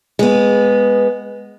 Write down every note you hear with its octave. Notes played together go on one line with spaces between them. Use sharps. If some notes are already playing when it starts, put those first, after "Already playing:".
G#3 B3